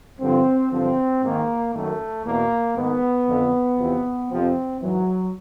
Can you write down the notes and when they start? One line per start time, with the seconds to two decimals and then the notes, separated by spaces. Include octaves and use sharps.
0.20 G2 D3 F3 C4
0.72 G2 D3 F3 C4
1.22 G#2 D#3 A#3
1.74 F#2 D#3 A3
2.25 E2 B2 A#3
2.76 G#2 D#3 B3
3.27 F2 D3 F3
3.78 E2 C3 F3
4.30 F2 C3 F3 C4
4.81 G#2 E3 F#3